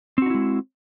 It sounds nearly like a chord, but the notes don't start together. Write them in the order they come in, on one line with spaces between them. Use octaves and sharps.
C4 F#4 D#4 E4 G#3